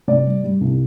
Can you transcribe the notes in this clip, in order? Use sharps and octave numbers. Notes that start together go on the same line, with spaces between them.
C3 D5
G3
G3
C2